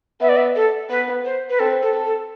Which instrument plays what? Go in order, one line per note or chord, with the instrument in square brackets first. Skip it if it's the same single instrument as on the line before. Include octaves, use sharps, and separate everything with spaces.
[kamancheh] B3 [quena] E5
[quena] D5
E5
A4
[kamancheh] B3 [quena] B4
[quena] C5
B4
[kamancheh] C4 [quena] A4
[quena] A4
[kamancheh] A4
[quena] A4